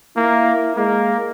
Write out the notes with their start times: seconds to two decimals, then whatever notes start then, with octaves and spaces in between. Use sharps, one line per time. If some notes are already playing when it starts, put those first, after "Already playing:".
0.17 A#3 E4
0.76 G#3 A#3